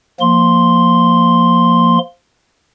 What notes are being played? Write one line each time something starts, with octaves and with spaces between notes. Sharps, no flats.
F3 A#3 C6